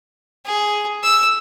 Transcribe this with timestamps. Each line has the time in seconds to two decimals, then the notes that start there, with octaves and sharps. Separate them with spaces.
0.46 G#4
1.03 E6